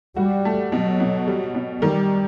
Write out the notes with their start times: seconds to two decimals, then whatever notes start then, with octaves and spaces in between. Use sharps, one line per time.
0.17 G3 F#4
0.45 A3
0.72 B2 F#3
1.00 B2
1.27 G3
1.55 B2
1.82 D#3 G3